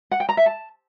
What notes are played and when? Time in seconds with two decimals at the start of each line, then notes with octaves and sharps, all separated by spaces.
0.11 F#5
0.20 G5
0.29 A#5
0.37 E5
0.46 A5